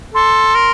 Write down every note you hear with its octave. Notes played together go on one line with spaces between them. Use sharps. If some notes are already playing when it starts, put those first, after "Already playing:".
A4 C6
A#4